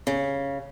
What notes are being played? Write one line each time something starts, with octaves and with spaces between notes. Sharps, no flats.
C#3